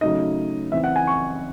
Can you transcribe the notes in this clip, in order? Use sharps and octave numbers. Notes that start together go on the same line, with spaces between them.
C#3 F#3 A3 D#4 D#5
C#3 E3 C4 E5
F#5
G#5
C#6